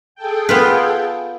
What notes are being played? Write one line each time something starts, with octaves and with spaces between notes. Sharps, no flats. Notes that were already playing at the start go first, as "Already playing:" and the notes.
G#4 A4 G5
B3 F4 B4